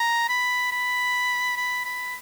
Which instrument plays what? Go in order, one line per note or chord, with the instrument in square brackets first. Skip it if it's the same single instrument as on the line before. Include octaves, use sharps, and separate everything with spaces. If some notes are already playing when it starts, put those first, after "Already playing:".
Already playing: [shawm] A#5
B5
B5
B5
B5